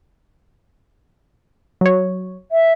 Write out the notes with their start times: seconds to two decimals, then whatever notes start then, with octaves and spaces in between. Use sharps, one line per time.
1.81 F#3 C#5
2.52 E5